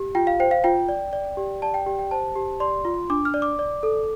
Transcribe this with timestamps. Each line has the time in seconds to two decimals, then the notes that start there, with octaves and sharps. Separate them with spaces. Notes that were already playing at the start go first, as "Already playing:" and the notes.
Already playing: G4
0.15 F4 G5
0.27 F5
0.40 C5 G5
0.51 F5
0.64 F4 G5
0.89 D5
1.13 D5
1.37 G4
1.62 D5 A5
1.74 G5
1.86 G4 G5
1.99 G5
2.11 C5 A5
2.35 G4
2.60 D5 C6
2.85 F4
3.10 D4 D6
3.25 F6
3.34 D5
3.42 D6
3.59 D5
3.83 A4